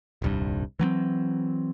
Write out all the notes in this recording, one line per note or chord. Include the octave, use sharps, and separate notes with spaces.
D#1 C2 G2
E3 F#3 A#3 C4